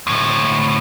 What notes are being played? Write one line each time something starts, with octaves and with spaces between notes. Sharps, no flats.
D2 A2